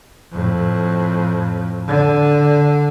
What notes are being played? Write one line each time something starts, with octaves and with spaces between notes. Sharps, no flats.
F2 A2
D3